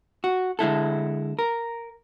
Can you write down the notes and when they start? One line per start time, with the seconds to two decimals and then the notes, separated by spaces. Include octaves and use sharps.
0.24 F#4
0.59 D3 G#3 E4 A4
1.39 A#4